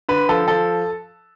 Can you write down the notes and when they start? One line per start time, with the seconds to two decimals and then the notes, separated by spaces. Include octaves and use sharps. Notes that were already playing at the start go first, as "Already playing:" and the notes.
0.09 D3 B4
0.29 F3 A4
0.48 F3 A4